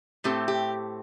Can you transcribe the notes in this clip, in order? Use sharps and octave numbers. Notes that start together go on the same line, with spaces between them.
A2 A3 C4 G4
G4